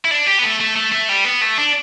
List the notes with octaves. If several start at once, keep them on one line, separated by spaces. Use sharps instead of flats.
E4
D4
G4
B3
A3
A3
A3
A3
G3
B3
A3
D4